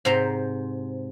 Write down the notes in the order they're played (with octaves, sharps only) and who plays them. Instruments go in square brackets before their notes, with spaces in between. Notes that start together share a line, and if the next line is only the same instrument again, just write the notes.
[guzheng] G#2 C3 C4 C5 A#5